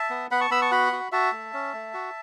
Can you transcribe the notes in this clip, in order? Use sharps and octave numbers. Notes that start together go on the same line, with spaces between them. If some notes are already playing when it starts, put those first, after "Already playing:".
Already playing: E5 A5
B3
B3 F#5 B5
A5 C#6
B3 B5 E6
A5 C#6
F#4 F#5 B5
F#4
F#4 E5 A5
A3
C#4
A3
F#4